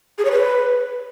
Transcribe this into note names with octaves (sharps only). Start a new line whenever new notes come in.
G#4
C#5
B4